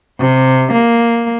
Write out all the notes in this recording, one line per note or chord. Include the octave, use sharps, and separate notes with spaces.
C3
A#3